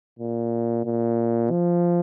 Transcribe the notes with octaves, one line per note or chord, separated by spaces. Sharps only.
A#2
A#2
F3